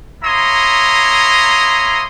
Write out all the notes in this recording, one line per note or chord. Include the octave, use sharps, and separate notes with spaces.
A#3 E4 C#5 A#5 C6 D#6